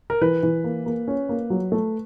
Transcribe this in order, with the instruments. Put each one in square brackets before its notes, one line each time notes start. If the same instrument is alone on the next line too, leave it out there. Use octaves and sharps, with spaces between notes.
[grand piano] A#4
[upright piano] E3 [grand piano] B4
[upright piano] E3
A#3
A#3
C#4
A#3
F#3
A3